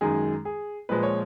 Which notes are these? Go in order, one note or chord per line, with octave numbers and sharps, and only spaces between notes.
F#2 D#3 G#3 G#4
G#4
A#2 F3 G#3 B4
C#5